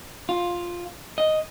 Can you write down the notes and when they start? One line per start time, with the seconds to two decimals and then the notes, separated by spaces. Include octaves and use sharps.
0.29 F4
1.18 D#5